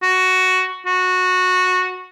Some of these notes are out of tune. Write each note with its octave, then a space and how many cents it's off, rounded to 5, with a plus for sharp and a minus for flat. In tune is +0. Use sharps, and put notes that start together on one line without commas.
F#4 +5
F#4 -10